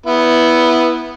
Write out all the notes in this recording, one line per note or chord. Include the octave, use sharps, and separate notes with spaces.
B3 E4